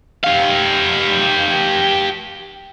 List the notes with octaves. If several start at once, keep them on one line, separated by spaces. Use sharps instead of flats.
G4 F5